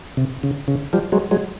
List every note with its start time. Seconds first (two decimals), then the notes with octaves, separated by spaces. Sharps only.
0.17 C3
0.43 C#3
0.68 C#3
0.93 F3 G3
1.12 F#3 G#3
1.31 F#3 G#3